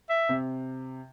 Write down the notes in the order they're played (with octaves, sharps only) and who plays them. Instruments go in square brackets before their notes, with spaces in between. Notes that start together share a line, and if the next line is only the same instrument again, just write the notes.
[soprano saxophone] E5
[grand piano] C3